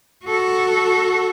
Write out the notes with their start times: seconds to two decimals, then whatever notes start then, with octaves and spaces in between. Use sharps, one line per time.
0.24 F#4 A4